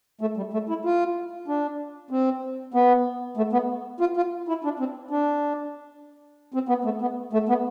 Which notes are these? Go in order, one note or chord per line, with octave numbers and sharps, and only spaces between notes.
A3
G3
A3
E4
F4
D4
C4
B3
A3
B3
F4
F4
E4
D4
C4
D4
C4
B3
A3
B3
A3
B3